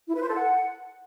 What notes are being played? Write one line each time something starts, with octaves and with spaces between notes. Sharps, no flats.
E4
B4
C5
A4
F#5